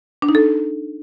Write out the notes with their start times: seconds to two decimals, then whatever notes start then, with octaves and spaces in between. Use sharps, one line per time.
0.22 D4
0.29 D#4
0.35 A4